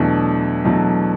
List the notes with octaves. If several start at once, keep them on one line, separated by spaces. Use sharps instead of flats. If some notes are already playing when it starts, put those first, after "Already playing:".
Already playing: E2 B2 F#3 A3 D4
E2 B2 F#3 A3 D4